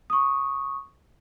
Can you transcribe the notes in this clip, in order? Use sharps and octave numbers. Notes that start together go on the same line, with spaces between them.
C#6 D#6